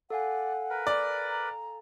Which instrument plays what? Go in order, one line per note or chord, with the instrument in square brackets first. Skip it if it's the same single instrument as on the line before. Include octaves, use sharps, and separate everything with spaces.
[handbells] A4 F5 G#5 [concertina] D5 [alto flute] F#5
[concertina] A#4 B4
[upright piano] D5
[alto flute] A#5